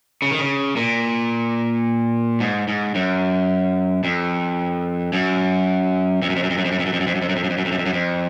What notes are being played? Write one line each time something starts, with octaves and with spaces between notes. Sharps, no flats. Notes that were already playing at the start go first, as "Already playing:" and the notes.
C#3
D#3
C#3
A#2
G#2
G#2
F#2
F2
F#2
F2
F#2
F2
F#2
F2
F#2
F2
F#2
F2
F#2
F2
F#2
F2
F#2
F2
F#2
F2
F#2
F2
F#2
F2
F#2
F2
F#2
F2